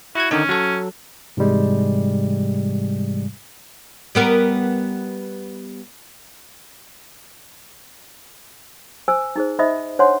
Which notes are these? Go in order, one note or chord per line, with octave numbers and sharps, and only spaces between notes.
E4 F#4 G#6
D3 D#3 C#4 D#4
F#3 A4
G#2 C3 E3 G3 G#3
G3 B3 A#4
C5 G#5 E6
D#4 G#4 C5
D#4 C5 D#5 E5 B5 D#6
D4 C5 C#5 F#5 G#5 C6